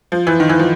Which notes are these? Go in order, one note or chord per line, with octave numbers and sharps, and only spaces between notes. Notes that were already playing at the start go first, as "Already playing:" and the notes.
F3
E3
D#3
E3
F3